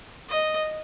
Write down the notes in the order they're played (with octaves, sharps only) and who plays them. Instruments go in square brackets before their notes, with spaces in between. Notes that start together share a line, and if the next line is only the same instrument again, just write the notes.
[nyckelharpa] D#5